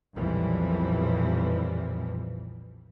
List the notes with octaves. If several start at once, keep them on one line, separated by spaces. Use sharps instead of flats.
B1 F2 A#2 E3 F3 G3